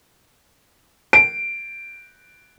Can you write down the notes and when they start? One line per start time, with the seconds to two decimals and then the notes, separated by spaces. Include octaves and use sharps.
1.13 D7